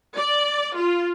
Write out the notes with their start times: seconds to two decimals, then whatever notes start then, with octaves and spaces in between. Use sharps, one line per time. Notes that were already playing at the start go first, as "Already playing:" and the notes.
0.17 D5
0.76 F4